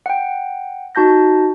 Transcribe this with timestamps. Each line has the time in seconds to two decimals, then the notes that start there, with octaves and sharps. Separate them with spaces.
0.06 F#5 G5
0.95 D#4 F#4 A5 G6 A#6